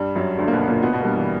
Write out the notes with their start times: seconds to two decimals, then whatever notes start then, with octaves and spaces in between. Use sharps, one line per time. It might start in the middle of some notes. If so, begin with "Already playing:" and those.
Already playing: G2 G3
0.15 F#2 F#3
0.38 D2 D3
0.48 A#3
0.53 B2 B3
0.67 A#2 A#3
0.83 B2 B3
0.93 B2 B3
1.00 A#3
1.04 G2 G3
1.16 E3